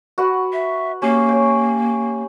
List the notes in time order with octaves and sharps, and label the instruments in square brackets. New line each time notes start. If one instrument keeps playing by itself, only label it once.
[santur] F#4 B4 F#5
[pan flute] E5
[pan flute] A#3 [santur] C#4 G4
[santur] C#5 G5